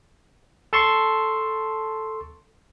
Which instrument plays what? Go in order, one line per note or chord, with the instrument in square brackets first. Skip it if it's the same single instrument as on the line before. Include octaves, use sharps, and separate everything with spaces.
[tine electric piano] A4 A5 C6 C#6